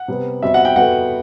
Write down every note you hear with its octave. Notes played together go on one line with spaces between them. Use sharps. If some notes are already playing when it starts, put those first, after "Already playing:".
Already playing: F#5
C3 G3 B3
B2 G3 C4 E5
F#5
G5
G3 B3 F#4 A4 F#5